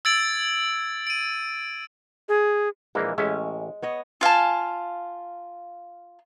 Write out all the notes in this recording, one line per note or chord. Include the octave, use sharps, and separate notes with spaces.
E6 G#6 A6 D7 F#7
D7 D#7
G#4
A#1 E3 G#3 A#3
A1 G#3 C#4 E5
B3 C#5 D#5
F4 F5 G#5 A5